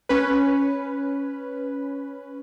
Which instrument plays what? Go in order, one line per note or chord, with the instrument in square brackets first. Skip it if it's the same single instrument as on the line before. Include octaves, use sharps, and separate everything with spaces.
[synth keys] C#4 B4